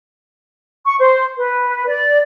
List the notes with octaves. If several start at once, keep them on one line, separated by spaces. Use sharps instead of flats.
C#6
C5
B4
D5